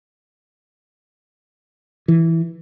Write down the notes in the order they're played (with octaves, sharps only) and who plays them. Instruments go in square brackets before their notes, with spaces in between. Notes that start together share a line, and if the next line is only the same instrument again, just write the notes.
[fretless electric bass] E3